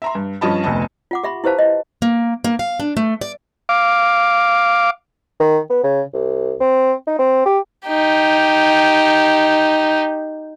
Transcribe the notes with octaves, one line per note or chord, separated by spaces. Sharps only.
E5 A#5 C6
G2
G2 F3 C#4 D#5 A5 B5
F1 D2 B3 D#5 A5
F4 F#5 D6
G4 E5 B5 C6
E4 G4 B4 C5 F5 A5
D#5
A#3
A#3
F5
D4
A3
D5
F5 D6
D#3
B3
C#3
C2
C4
D#4
C4
G4
D#4 G4